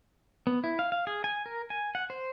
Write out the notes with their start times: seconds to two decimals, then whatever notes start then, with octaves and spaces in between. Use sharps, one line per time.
0.47 B3
0.64 E4
0.79 F5
0.92 F5
1.07 G#4
1.24 G#5
1.46 A#4
1.70 G#5
1.95 F#5
2.10 C5